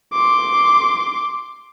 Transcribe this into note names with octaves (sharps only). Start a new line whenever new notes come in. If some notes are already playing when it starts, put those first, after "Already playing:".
C6 D6